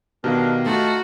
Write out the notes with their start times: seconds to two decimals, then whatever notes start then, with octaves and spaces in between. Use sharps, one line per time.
0.24 B2 D#3 D4 G4 A#4 F5
0.66 A3 D#4 F4 F#4 A5